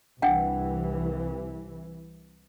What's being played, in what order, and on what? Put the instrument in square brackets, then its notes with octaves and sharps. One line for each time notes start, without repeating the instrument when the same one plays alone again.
[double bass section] C2 E3 [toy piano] D4 F#5 G5